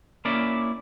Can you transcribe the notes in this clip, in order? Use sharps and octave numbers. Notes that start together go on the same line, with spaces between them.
A#3 C#4 E4 D5